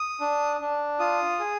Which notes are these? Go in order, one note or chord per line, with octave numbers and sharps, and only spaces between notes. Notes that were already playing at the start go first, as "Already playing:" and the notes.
Already playing: D#6
D4
D4
F4 D#6
G#4